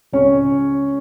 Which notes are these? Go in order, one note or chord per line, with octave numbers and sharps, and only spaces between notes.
C#2 C#3 G#3 C#4 C#5